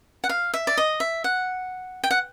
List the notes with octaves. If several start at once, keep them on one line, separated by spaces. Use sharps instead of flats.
F#5
F5
E5
D5
D#5
E5
F#5
G5
F#5